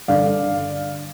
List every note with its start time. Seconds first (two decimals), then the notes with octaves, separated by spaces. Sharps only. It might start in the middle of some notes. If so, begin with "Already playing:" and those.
0.08 G2 D3 D5 F5
0.42 D3